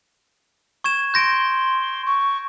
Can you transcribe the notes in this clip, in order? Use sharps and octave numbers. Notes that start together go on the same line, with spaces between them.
C#6 G#6 E7
C6 G6 A#6 D7
C#6